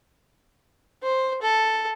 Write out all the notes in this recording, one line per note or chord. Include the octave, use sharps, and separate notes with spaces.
C5
A4